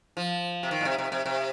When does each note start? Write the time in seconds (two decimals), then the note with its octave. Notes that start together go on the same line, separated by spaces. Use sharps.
0.17 F3
0.63 C3
0.71 D#3
0.81 A#2
0.85 C3
0.98 C3
1.12 C3
1.26 C3